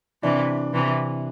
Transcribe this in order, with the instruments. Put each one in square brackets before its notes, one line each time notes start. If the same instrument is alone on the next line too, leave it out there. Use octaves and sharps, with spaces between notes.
[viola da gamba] C3 E3 [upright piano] D4
[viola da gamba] C3 E3